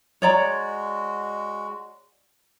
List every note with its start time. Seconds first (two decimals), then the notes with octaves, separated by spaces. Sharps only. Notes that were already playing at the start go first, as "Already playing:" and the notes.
0.22 G#3 F#4 C#5 D5 A#5